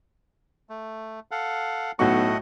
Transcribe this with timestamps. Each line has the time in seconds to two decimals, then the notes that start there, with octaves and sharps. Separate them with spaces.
0.69 A3
1.31 A4 F5 F#5
1.99 B1 A2 A3 F#4 D#5 F#5 C#6